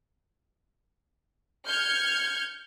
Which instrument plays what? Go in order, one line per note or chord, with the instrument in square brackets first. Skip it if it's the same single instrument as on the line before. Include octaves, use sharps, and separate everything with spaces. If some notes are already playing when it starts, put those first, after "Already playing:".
[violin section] F6 G6 G#6 C#7